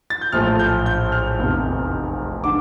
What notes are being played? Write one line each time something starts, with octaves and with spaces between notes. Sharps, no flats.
A6
G6
A#1 A2 F3 A3 F6
G6
G6
F6
F1 E2 C3
D3 D6